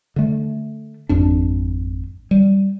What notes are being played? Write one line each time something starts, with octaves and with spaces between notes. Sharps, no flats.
D3 A3
G#1 F2 D4
G3